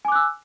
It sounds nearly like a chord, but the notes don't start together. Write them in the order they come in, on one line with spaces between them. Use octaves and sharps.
G#5 D6 F#6 E6